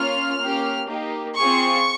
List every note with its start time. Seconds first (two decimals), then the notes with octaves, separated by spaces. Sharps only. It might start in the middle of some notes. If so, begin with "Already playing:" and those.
Already playing: A#3 C#4 F4 F6
0.38 A#3 C#4 G4
0.88 A#3 D#4 G4
1.37 C4 F4 G#4 C#6